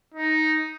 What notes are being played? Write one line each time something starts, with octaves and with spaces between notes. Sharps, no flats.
D#4